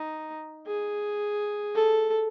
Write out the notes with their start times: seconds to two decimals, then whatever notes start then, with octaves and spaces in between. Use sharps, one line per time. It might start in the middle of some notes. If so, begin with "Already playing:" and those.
Already playing: D#4
0.66 G#4
1.75 A4